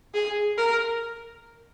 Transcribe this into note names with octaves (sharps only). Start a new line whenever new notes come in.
G#4
A#4